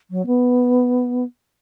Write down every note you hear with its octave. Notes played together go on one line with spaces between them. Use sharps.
F#3
B3